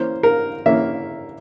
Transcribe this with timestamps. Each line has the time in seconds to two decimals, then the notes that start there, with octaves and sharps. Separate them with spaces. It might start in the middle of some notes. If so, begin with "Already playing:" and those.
Already playing: E3 A#3 C#4 C5
0.23 A#4
0.66 E3 A#3 C#4 E5